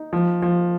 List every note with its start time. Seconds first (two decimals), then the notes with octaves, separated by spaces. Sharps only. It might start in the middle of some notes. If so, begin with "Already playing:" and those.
Already playing: D#4
0.13 F3
0.42 F3